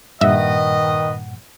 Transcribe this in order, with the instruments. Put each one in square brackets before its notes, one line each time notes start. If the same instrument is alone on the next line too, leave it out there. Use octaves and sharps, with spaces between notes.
[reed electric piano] G2 A#2 F#5 [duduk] D#3 [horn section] B4 D#5 [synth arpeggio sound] E5